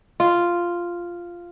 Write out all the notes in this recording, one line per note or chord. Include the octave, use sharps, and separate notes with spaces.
F4